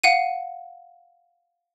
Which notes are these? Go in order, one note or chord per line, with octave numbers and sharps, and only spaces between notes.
F5 F#5 D#7